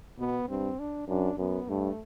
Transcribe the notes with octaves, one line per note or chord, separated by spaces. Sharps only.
B2 B3
G2 C4
D4
F#2 D4
F#2 B3
G2 A3